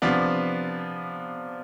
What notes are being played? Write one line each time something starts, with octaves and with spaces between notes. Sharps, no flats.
C3 F3 B3 D4